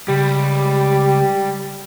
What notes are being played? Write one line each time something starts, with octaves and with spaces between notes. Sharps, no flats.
C#2 G3 G4